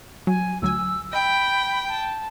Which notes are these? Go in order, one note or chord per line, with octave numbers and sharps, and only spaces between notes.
F#3 G#5
D2 F#3 G#5 E6
D#5 G5 B5
A5